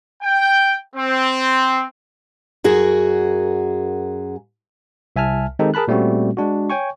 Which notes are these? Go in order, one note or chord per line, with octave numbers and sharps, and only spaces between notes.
G5
C4
F#2 F#4 G#4 A#4
C2 E5 G#5 A5 F6
D#3 G#3 C4 D#4 G4 A4
G#4 A#4 A5 B5 F#6
A#2 G3 A3 C4 C#4 F#4
G#3 D4 F#4
C#5 G5 G#5 C#6